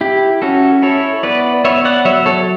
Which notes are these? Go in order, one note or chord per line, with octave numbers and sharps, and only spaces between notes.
E4 G4
C#4 F#4 A4
E4 A4 C#5
B3 B4 D5
B3 C#5 E5
D5 F#5
F#3 C#5 E5
A4 C#5